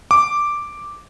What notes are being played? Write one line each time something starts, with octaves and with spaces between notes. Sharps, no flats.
D6